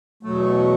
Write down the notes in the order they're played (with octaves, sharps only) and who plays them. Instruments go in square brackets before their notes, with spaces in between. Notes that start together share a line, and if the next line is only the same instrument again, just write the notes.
[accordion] E2 B2 F#3 A3